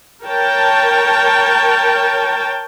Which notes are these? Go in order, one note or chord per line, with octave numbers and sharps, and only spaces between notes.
A#4 C#5 G5 A5